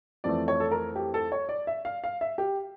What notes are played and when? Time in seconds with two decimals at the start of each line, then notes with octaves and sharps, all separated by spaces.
0.24 F2 E3 A3 D5
0.48 C#5
0.60 A4
0.71 A#4
0.96 G4
1.14 A4
1.32 C#5
1.49 D5
1.67 E5
1.85 F5
2.04 F5
2.21 E5
2.38 G4